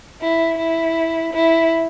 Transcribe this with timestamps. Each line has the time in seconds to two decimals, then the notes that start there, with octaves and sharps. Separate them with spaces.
0.21 E4
0.58 E4
1.33 E4